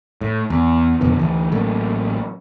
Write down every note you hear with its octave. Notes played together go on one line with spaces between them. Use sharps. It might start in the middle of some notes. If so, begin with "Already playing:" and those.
A2
E2
F2 B2 D3 B3
D2 E3
A1 F#3 A3 A#3